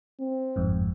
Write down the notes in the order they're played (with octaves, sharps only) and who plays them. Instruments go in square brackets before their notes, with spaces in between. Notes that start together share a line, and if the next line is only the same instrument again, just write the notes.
[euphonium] C4
[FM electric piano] G1 F2 G#2